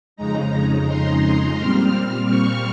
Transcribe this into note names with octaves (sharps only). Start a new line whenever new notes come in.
F2 C#3 G#3 D#4 A#5
C6
A#2 G3 C4 F6
C#6